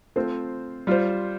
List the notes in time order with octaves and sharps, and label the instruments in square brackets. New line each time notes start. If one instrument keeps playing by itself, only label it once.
[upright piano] A3 C4 F4 C5
G3 F4 C5